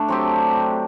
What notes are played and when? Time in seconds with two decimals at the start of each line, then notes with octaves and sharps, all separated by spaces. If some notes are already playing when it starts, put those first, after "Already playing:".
Already playing: A3 D4
0.08 F#3 C4 G4